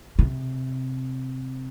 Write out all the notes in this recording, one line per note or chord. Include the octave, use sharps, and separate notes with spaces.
C3